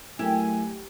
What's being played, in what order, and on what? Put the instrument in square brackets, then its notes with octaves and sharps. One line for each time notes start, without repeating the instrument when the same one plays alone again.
[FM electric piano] F#3 A3 A#4 [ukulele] E4 [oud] G4 [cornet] G#5